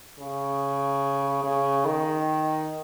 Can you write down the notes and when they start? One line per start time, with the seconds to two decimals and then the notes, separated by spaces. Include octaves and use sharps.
0.19 C#3
1.44 C#3
1.85 D#3